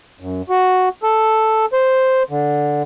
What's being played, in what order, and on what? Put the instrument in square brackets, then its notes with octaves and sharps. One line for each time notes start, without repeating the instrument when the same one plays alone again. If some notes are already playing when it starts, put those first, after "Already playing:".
[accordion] F#2
F#4
A4
C5
D3